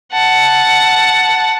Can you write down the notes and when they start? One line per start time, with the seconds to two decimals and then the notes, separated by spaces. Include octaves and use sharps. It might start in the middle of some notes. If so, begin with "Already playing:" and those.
0.12 F#5 A5